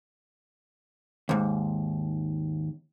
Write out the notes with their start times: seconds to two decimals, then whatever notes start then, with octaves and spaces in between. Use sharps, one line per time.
1.29 D#2 G#2